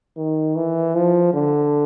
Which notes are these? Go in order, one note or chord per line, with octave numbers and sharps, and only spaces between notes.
D#3
E3
F3
D3